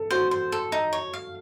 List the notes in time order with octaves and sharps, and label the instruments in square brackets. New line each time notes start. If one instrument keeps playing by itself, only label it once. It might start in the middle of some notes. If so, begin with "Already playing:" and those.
Already playing: [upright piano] A4
[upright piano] F#4 [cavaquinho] C5
[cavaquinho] C5
A4
D#4
C#5
F5